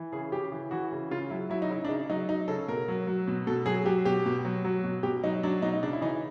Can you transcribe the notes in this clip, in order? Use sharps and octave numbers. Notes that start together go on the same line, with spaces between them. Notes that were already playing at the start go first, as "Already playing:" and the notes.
Already playing: E3
C#3 G#4
C#3 G4
E3
E3 F#4
C#3
C#3 F4
F#3 E4
F#3 E4
D#4
C#3 E4
D4
C#3 D#4
F#3 D#4
F#3 D#4
C#3 A4
B2 A#4
F#3
F#3
B2
B2 A4
F#3 G#4
F#3 G4
B2 G4
B2
F#3
F#3
B2
B2 G4
F#3 D#4
F#3 D4
B2 D#4
D#4
C#3 D4
E4
E3 D#4